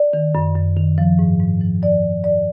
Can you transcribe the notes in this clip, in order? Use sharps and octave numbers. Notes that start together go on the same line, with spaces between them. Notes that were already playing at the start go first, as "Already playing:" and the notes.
Already playing: D5
D#3
F#2
F#2
D#3
F3
G#2
G#2
F3
F3 D5
G#2
G#2 D5